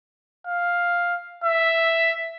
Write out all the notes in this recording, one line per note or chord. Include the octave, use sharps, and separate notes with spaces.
F5
E5